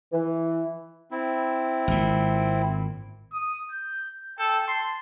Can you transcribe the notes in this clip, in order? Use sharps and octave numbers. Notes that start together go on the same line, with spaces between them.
E3
C4 E4
G#1 A#2
D#6
G6
A4 G5
A5 C6